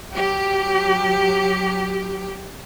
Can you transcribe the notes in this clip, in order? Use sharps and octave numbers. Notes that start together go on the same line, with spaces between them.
F#3 G4